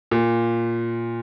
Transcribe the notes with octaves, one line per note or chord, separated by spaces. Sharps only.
A#2